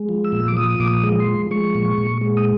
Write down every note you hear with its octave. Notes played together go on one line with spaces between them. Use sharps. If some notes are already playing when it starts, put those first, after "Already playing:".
Already playing: G#3
F3
E6
A#2
D6
F3 D#6
A#2 D6
D#6
G#3
C6
F3
G#3 C#6
A#2
A#2
G#3
D#6